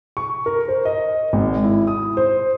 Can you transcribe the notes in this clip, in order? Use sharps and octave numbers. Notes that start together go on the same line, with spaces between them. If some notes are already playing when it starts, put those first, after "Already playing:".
C#6
A#4
C5
D#5
G#1
E4
D#6
C5